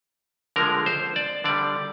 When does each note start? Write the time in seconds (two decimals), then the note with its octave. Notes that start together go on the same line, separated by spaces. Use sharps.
0.56 D3 F3 G#3 A#4
0.86 C5
1.16 D5
1.44 D3 G3 D5